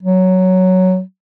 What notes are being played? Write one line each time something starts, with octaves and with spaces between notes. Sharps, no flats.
F#3